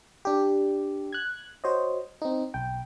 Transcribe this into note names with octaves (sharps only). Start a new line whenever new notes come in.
D4 G4
F#6 G#6
F#4 C5 C#5 D#5
C4 D#4
B1 G5